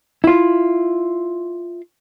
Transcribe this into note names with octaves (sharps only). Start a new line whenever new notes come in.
E4 F4